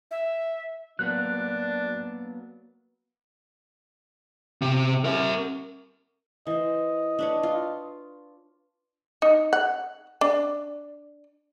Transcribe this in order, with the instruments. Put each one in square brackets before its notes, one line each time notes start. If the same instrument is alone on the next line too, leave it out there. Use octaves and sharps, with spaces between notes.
[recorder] E5
[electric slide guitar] F#3 A#3 B3 [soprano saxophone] D4 [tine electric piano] F#6
[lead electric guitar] C3
A#4 E5
[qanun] E3 C5 [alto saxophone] D#5
[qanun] D4 B4 C#5
F4
[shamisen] D#4
F#5
D4